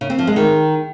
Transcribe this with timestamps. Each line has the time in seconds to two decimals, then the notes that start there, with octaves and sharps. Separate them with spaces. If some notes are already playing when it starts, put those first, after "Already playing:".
0.01 C#3
0.10 C4
0.19 F3
0.27 G#3
0.36 D#3